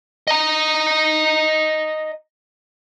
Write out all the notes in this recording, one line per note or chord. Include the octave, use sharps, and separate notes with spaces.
D#5 A#5